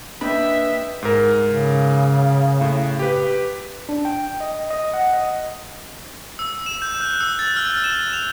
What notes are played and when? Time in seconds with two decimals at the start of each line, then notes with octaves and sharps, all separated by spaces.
0.21 A#3 D4 B4 D#5 E5 G5 B5
1.02 G#2 A#4
1.49 C#3
2.61 A2
2.99 G4 B4
3.89 D4
4.05 G5
4.40 D#5
4.70 D#5
4.94 F#5
5.13 D#5
6.39 E6
6.66 E7
6.82 G6
7.01 F#6
7.21 E6
7.39 A6
7.56 F6
7.84 E7
8.13 F7